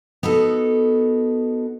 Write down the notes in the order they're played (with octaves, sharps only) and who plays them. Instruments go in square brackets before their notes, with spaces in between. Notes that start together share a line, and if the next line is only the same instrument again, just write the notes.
[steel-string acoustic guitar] B3 D#4 F#4 A4